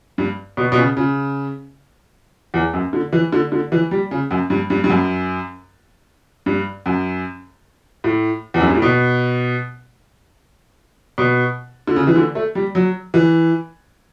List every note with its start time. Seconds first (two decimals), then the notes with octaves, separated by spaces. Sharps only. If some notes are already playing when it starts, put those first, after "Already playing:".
0.18 G2
0.57 B2
0.72 B2
0.77 C#3
0.97 C#3
2.54 E2
2.73 F#2
2.93 D3
3.13 E3
3.33 D3
3.52 D3
3.72 E3
3.91 G3
4.11 C#3
4.31 F#2
4.50 G2
4.70 G2
4.84 G2
4.90 F#2
6.46 G2
6.86 F#2
8.04 A2
8.54 E2
8.61 F#2
8.68 G2
8.75 A2
8.82 B2
11.18 B2
11.87 D3
11.96 C#3
12.07 E3
12.16 D3
12.35 A3
12.55 G3
12.75 F#3
13.14 E3